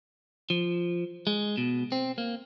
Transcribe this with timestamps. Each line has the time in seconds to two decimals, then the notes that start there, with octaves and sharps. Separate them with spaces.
0.50 F3
1.27 G#3
1.57 B2
1.92 C4
2.18 A#3